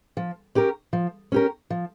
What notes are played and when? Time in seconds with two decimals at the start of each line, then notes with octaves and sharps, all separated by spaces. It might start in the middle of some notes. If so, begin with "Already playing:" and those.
0.17 F3
0.55 C#4 G4 A#4
0.93 F3
1.32 C#4 G4 A#4
1.70 F3